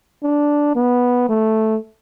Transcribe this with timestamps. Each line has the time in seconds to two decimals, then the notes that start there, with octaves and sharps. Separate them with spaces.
0.23 D4
0.76 B3
1.29 A3